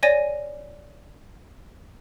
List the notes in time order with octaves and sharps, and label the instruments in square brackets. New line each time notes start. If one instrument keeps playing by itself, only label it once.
[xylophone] C#5 D5 G#5 A#6 D#7